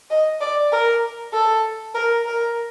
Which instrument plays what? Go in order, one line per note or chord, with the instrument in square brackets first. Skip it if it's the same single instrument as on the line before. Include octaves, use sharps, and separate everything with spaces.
[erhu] D#5
D5
A#4
A4
A#4
A#4